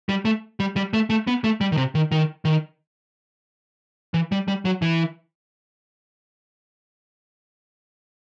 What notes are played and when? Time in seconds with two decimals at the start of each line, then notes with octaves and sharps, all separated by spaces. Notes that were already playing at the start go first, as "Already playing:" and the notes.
0.09 G3
0.25 A3
0.60 G3
0.76 G3
0.93 A3
1.10 A3
1.27 B3
1.44 A3
1.61 G3
1.72 D#3
1.77 C3
1.95 D#3
2.12 D#3
2.45 D#3
4.14 E3
4.32 G3
4.48 G3
4.65 F#3
4.82 E3